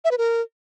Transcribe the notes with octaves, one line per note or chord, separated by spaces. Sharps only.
E5
B4
A#4